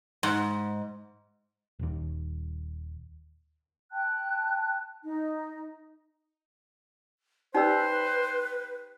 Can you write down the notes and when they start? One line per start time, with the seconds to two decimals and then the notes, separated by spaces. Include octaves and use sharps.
0.23 G#2
1.79 D#1 D#2
3.91 G5 A5 F#6
5.03 D#4
7.54 D#4 G4 B4 C5 D5 E6